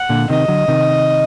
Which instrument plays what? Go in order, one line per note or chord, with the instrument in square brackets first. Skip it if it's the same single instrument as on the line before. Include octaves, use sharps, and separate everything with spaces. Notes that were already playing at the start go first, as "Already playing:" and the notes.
Already playing: [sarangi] F#5
[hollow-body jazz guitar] A#2 D3
[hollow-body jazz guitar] C3 D#3 [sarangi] D#5
[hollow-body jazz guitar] D3 F#3
C3 D#3